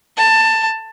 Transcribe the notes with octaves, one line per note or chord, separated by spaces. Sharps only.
A5